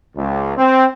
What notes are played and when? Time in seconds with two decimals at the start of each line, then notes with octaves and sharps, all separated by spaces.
0.16 C#2
0.57 C4